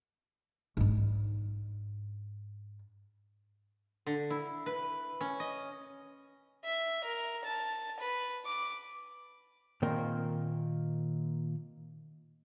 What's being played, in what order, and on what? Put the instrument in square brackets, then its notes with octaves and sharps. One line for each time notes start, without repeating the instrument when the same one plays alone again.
[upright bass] G#2 D4
[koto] D3
E4
B4
C#4
D#5
[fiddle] E5
A#4
A5
B4
D6
[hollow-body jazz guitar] A#2 D#3 A#3 C4 A#4 G5